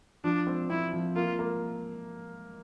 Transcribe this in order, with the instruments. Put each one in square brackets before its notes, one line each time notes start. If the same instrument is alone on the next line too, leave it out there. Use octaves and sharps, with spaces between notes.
[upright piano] F3 [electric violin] D4
[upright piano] C4
[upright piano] C4 [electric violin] E4
[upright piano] F3
[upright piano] A#3 [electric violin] F4
[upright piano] A#3